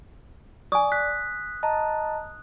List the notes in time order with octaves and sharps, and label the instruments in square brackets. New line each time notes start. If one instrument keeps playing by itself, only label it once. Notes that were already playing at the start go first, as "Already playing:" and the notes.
[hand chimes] D5 [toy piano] G#5 C#6 [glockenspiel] D#6
[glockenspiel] F#6 [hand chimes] B6
[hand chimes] D#5 A5 A#5